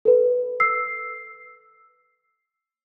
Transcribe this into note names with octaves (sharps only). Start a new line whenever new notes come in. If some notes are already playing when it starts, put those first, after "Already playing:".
A4 B4
E6 C7